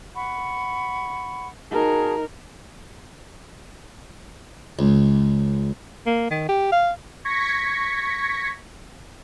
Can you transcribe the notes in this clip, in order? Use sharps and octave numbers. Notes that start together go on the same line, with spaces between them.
F#5 B5 C#6
D#4 F#4 G#4 A#4 A5
C#2
A#3
D#3
G4
F5
C#6 G#6 A#6 B6 C#7